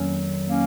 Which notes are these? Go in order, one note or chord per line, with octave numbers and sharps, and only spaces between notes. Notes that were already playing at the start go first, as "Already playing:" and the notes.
Already playing: F2 D#3 F#3 A#3 C#4
A#3 C#4